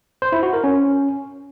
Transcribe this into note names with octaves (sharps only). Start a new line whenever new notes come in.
C5
E4
F#4
A#4
C#4